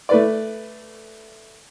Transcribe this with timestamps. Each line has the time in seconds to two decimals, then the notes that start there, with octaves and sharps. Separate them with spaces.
0.09 A3 B4 D5